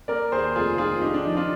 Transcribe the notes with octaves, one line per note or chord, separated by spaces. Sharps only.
A#3 A#4 D5
D#2 G#4 C5
F1 F4 G#4
D#3 F4 G#4
D4 D#4 G4
D4
F3 D#4
D4 F4